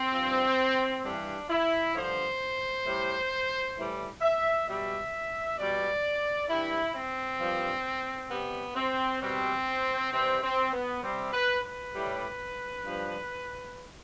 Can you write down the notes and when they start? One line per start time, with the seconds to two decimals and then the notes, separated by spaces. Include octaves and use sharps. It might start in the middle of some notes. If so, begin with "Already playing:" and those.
Already playing: C4
0.13 G2 F3
1.03 G2 E3 G3 D4
1.50 E4
1.94 G2 D3 F3 C5
2.85 A2 G3
3.77 A2 E3 G3
4.21 E5
4.67 B2 G3 E5
5.57 B2 G3 D5
6.48 G2 E3 G3 E4
6.94 C4
7.40 G2 F3
8.30 C3 G3 B3
8.75 C4
9.21 B2 G3 C4
10.11 C3 E3 G3 C4
10.42 C4
10.73 B3
11.03 C3 G3 C4
11.33 B4
11.64 B4
11.94 A2 G3
12.84 G2 F3